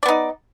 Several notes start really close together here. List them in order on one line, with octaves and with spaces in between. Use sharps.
D5 B3 D#4